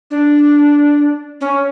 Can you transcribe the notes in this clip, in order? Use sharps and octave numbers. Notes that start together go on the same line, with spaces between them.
D4
C#4